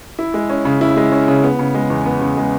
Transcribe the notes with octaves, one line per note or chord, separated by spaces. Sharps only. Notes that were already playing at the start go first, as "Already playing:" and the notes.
E4
G#3
C#4
C#3
E4
G#3
C#4
C#3
B3
C#3
G#3
E2
B3
C#3
G#3